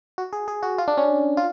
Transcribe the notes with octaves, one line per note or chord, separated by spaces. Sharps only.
F#4
G#4
G#4
F#4
F4
D4
C#4
F4